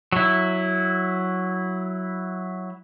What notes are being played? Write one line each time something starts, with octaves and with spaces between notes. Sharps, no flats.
F#3 E4